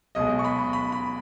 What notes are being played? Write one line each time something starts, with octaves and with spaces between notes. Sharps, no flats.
B1 B2 G#3 D#5
C#6
B5
B5
B5